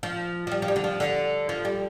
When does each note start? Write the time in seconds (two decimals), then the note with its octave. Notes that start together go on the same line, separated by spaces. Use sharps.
0.03 F3
0.47 F3
0.51 G3
0.62 F3
0.68 G3
0.76 D3
0.84 F3
1.00 D3
1.49 F3
1.65 G3